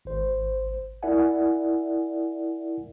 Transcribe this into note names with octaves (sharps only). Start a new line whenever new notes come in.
G#1 C5
E4 A#4 D5 E5 F#5 G#5